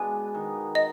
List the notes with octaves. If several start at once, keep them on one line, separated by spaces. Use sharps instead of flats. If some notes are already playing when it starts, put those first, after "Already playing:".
Already playing: B2 G#3 B3 D4 G#5
D#3
D#5